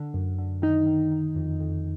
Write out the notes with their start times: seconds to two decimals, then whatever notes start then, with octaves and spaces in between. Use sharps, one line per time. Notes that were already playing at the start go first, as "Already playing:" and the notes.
Already playing: D3
0.14 F#2
0.39 D3
0.62 D#3 D#4
0.87 D#3
1.12 D#3
1.36 F2
1.61 F2